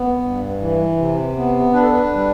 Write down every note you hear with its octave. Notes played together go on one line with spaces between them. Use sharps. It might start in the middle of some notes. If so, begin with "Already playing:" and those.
Already playing: B3
G2
E3
C3
B3
D4 B4
A4
B4
G3